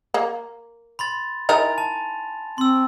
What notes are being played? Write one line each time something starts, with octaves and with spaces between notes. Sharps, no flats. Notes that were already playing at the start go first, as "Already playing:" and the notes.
A#3
B5 C6 A6
D#4 E4 A#4 G#5 A6 F7
A5
C4 C6 E6